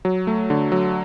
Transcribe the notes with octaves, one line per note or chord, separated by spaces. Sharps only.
F#3
A3
D3
F#3